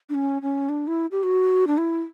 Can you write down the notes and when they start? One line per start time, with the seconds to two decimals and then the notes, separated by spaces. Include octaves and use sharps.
0.09 D4
0.14 C#4
0.42 C#4
0.69 D4
0.87 E4
1.11 G4
1.23 F#4
1.67 D4
1.78 E4